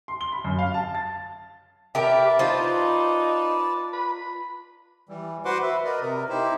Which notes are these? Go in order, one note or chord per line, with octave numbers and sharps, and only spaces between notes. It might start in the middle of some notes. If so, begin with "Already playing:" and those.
C6
G7
B5
F#2
F5
A5
A6
G4 A#4 B4 D5 E5 A5
D#4 F4 C5
B5
E3 G3
F#4 B4 C5 F#5 C6 D6
B4 E5
A#4 B4 D5 D#5
C3 A#4
D#4 E4 G4 C5